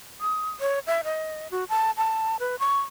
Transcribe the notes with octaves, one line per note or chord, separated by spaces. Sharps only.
D#6
C#5
E5
D#5
F#4
A5
A5
B4
C#6